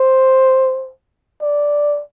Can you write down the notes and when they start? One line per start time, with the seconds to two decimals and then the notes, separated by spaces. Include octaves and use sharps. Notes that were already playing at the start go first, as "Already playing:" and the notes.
Already playing: C5
1.42 D5